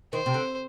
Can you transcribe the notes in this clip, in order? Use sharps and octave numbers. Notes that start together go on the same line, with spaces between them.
D#3 C5
C3
D3